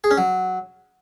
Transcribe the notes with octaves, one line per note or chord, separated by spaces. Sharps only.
G#4
C#4
F#3